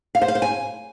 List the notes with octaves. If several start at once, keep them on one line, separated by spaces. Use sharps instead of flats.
F5
C5
F5
C5
G#5